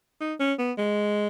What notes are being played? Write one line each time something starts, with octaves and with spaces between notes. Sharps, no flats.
D#4
C#4
B3
G#3